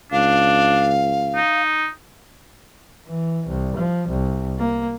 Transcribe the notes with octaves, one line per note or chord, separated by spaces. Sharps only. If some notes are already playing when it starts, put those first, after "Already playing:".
C#2 D4 F5
D#4
E3
C2
F3
C2
A#3